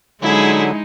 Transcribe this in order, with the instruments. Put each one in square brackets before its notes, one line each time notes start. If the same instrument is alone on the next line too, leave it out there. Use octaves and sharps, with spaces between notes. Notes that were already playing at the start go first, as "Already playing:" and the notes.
[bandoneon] D3 F#3 [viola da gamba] G#3 D#4 [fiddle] E4 G#4